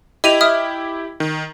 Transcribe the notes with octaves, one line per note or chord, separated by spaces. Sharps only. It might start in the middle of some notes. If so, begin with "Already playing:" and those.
E4 G4 D#5 D#7 F7
E5 D#6 F6
D#3